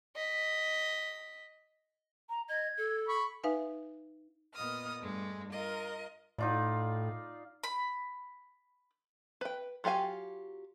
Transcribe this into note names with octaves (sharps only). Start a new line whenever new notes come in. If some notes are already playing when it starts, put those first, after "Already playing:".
D#5 B6
A#5
D#5 G#6
A4
B5 C#6
D#4 B4 E5 F5 G#5
A#2 B3 D#5 D#6 F6
G2 G#3 A3
F4 A#4 D#5
A2 D#4 F4 D5
B5
B4 G5
F#3 F4 G4 F5 G#5